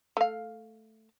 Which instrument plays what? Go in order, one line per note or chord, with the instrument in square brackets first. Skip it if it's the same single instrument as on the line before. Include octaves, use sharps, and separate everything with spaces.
[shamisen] A3 F5